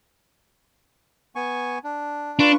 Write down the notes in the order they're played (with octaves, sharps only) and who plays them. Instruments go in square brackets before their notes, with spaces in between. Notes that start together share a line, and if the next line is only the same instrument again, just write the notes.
[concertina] B3 G#5 C#6
D4
[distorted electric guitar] D4 [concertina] F4 B4 C#6